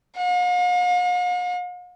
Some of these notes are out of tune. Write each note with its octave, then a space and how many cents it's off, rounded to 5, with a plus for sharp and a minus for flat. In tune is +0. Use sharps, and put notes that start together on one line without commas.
F5 +45